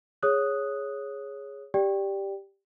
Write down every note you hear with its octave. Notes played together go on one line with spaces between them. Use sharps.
G#4 C#5 D#6 F#6
G4 D5 G5